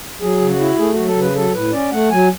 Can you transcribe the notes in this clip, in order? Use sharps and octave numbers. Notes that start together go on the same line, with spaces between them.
F#3 G#4
C#3
F#4
E4
A3 G#4
F#3 F#4
A4
C#3 B4
F#3 A4
A2 B4
C#4 D5
A3 F#5
F#3 G#5